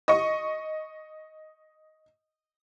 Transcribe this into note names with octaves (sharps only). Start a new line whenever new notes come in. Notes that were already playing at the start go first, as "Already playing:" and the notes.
D#5 C#6